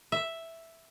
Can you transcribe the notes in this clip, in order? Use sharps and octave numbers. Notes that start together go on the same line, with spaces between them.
E5